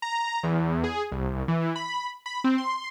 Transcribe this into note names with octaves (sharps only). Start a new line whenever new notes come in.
A#5
E2
G#4
C2
E3
B5
B5
C4
C6